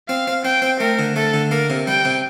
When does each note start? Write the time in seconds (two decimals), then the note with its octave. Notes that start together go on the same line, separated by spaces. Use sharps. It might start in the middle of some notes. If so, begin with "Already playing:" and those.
0.09 C4 F5
0.27 C4
0.45 C4 G5
0.62 C4
0.80 A3 A#4
0.99 D3
1.16 A3 A4
1.34 D3
1.51 A#3 A#4
1.70 C3
1.87 G3 G5
2.05 C3